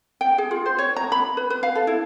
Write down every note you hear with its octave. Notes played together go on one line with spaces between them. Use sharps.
G5
G#4
F4
C5
C#5
A#5
B5
B4
B4
F5
A4
E4